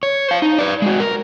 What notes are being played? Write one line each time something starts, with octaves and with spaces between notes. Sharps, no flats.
C#5
C5 F5
D#4
B4 D5
G#3 F#4
A#4